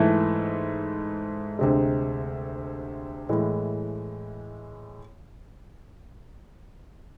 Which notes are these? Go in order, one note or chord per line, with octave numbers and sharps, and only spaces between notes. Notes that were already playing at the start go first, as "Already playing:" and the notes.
Already playing: G#2 E3 A3 E4
D2 C3 G#3
A2 E3 G#3